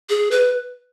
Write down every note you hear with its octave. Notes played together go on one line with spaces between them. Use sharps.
G#4
B4